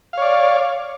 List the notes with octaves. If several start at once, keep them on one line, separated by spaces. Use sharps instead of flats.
C#5 D5 F5